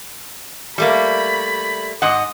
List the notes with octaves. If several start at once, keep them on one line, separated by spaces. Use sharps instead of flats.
G3 A3 A#3 B5
G#2 D#5 F#5